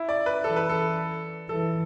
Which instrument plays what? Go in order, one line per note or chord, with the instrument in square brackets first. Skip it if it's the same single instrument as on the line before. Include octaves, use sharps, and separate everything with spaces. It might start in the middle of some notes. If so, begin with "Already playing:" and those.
Already playing: [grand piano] E4
D5
B4
[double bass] E3 [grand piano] A4
[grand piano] B4
A4
[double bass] E3 [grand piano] A4